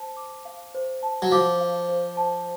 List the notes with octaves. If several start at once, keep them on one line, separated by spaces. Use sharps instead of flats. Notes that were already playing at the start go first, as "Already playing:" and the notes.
Already playing: C5 A5
D6
F5
C5
A5
F#3
F3 D6
F5
C5
A5